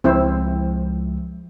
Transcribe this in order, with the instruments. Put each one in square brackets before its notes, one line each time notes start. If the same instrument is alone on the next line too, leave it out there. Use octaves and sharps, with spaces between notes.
[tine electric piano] C#2 F3 G#3 [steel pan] C4 E4 C5